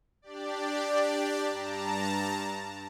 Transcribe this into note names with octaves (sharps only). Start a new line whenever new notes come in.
D4 G4 D5
G2 A5 A#5